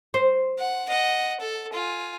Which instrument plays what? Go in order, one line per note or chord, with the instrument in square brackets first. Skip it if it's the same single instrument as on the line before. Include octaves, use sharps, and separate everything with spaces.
[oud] C5
[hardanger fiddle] F#5
D#5 F#5
A4
F4 G#5